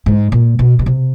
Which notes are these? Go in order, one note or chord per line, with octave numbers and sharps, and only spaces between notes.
G#2
A#2
B2
B2
C3